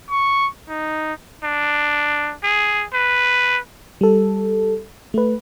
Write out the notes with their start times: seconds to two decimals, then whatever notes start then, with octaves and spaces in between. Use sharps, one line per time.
0.10 C#6
0.69 D#4
1.44 D4
2.43 G#4
2.94 B4
4.01 G3 A4
5.14 A3 B4